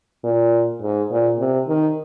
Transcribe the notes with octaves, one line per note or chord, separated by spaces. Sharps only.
A#2
G#2
A#2
C3
D#3